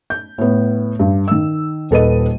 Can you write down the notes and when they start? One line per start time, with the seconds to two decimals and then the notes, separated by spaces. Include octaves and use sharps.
0.10 G6
0.38 A2 B3
1.00 G2
1.28 D#3 E6
1.91 D#1 A4 B4 D#5 D#7